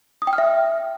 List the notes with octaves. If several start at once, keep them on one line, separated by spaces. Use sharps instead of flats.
D#6
G5
F6
E5